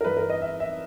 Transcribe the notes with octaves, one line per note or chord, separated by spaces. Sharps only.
A#4
G2 E3 B4
A#4
D#5
E5
E5